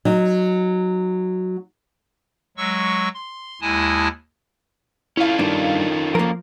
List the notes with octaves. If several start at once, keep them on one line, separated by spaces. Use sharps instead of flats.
F#3 D#4
F#3 G#3 C#6 E6
C6
D#2 G#3 E4 G#5 A5 D#6
C#4 E4 F4 A4 F5
G2 D#3 D4
F3 A#3 A#4